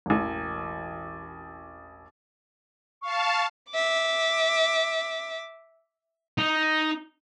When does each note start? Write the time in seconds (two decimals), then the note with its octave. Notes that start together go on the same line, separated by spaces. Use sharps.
0.06 E1 A1
3.02 F5 A5 C#6
3.71 E5 D6
6.38 D#4